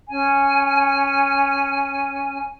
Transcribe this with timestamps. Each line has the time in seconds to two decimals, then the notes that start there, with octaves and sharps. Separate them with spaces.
0.08 C#4 G#5